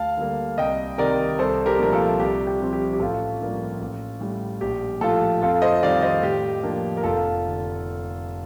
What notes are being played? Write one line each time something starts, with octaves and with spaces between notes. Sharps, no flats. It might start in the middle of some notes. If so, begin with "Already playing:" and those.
Already playing: D2 F5 A5
D3 G3 A#3
C2 D#5 G5
C3 D#3 A#4 D5
C2 A4 C5
G4 A#4
A#2 F3 A3 D4 A#4
F4 A4
C2 G4
G4
C3 F3 C4
G4
G4
A1 F4 A4
G2 F3 A#3 D4
A1
A2 G3
A#1 G4
A2 F3 F4 A4
F2 F4 A4
C5 D#5
D#3 G3 C4 D5 F5
C5 D#5
A2 G4
F3 A#3 D4
A#4
F1 F4 A4
D3